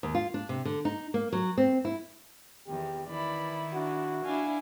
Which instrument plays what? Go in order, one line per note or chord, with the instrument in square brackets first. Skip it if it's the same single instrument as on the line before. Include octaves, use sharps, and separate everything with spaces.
[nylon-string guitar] D#2
F4
D4
C3
D3
D#4
A#3
F#3
C4
E4
[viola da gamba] E2 D#3 [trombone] G4
[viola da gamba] D#3 E4 [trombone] E3 [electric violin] D5 B5
[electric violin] D4 [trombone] F#4
[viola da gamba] D4 E4 [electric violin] F5 G#5